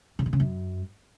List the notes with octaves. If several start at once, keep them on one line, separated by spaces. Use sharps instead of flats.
C#3
B2
C#3
F#2